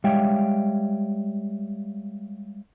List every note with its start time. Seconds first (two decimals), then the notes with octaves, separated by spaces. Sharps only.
0.04 G3 G#3 C#5 E5 F5 G5